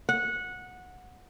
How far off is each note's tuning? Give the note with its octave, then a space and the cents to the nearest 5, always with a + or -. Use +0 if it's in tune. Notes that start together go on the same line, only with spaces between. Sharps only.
F#5 -15